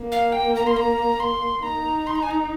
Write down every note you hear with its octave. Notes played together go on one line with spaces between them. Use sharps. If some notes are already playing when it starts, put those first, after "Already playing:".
Already playing: A#3
F5
G5
A#5
C6
A#5
C6
D#4 A#5
C6
A#5
G#5
A#5